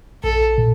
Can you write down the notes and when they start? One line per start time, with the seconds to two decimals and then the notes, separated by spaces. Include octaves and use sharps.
0.23 A#1 A4
0.58 A#2